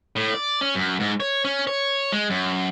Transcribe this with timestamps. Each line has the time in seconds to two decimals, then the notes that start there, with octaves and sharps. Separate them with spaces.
0.16 A2
0.34 D5
0.61 C#4
0.75 F#2
1.00 G#2
1.20 C#5
1.45 C#4
1.67 C#5
2.12 G#3
2.30 F#2